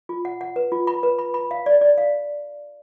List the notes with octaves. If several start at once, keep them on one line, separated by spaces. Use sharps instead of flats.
F4
F#5
F#5
B4
F4
B5
B4
B5
B5
F5
D5
D5
F5